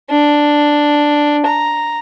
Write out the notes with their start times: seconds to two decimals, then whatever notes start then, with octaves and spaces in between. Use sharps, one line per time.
0.10 D4
1.46 A#5